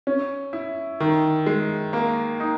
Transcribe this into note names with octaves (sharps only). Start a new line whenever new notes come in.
C#4
E4
D#3
G#3
A#3
D#4